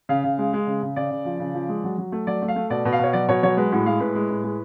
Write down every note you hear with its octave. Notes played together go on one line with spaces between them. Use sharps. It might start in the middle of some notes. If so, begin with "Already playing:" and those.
C#3 F5
C#3
G#3
G#3
C#3
C#3
C#3 D5
C#3
F3
C#3
F3
G#3
F#3
F#3
A3
F#3 D5
A3
F5
A3
B2 D5
B2
F5
B2 C#5
F#3 D5
B2 C#5
F#3 C#5
G#3 B4
A2 F#4
G#3 F5
A2 B4
G#3
A2
G#3